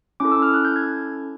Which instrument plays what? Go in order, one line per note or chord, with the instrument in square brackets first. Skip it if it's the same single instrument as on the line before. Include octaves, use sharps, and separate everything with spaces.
[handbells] C#4 E4 A4 D6
E6
F6
F#6
G6
G#6